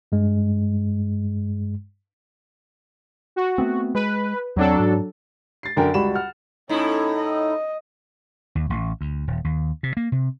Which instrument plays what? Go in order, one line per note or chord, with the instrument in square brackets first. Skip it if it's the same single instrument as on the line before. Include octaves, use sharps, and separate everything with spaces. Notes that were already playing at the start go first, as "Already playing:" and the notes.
[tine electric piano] G2 G#3
[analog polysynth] F#4
[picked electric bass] A3 B3 C4
[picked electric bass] G#3 [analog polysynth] B4
[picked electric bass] E2 C4 [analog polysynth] F#3 D4 A4
[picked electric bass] G#2
[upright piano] A6 C7
F#2 D3 A#4 G5
C#2 G3 F#4 G4 B5 E7
F#5 F6
[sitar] A2 E4 [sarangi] C#4 [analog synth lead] D#4
[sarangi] D#5
[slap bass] D#2
A1
D2
D#1
D#2
C3
A#3
C3